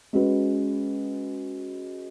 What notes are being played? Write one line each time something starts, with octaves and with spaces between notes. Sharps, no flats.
G#3 C#4 F#4 B4